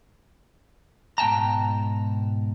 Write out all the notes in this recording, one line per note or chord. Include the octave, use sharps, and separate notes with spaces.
G#2 B2 G5 A5 A#5